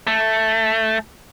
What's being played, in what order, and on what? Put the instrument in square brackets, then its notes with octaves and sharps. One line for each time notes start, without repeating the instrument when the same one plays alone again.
[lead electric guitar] A3